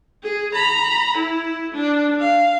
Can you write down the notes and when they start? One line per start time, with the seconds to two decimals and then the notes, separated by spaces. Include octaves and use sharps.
0.23 G#4
0.54 A#5 B5
1.17 E4
1.74 D4
2.19 F5